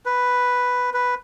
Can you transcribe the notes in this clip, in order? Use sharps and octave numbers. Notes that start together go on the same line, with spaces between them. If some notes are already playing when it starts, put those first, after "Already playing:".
B4
B4